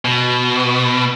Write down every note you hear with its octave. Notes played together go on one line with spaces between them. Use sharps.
B2